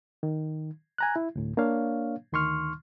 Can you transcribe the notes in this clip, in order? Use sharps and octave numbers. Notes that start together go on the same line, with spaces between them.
D#3
G#5 A#5 F#6
E4
D2 A2
A#3 D4 C#5 F5
D2 D#3 C6 C#6 F6